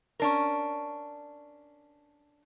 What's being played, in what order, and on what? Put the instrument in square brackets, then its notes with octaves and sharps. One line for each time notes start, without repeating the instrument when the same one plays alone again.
[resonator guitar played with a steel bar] C#4 D4 A#4